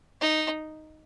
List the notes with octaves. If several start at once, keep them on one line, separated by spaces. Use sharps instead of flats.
D#4